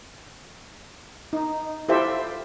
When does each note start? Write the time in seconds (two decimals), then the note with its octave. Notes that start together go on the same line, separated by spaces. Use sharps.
1.33 D#4
1.89 E4 F4 G4 A4 C5 E5